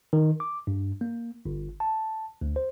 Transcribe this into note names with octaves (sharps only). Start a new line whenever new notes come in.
D#3
D6
G2
A#3
G1
A5
D2
C5